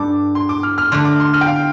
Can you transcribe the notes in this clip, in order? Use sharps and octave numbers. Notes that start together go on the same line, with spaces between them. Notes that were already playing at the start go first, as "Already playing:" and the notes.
Already playing: G2 G3 D4 A4 D6
C6
D6
F6
F6
D3 A3 D4 C6
D6
C6
F6
G5
F5